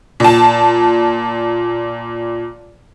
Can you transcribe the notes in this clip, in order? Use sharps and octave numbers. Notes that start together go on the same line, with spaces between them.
A#2 A5